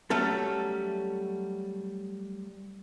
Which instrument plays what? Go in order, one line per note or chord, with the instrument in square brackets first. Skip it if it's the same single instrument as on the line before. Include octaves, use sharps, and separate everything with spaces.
[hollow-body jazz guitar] F#3 G3 A3 C#4 A4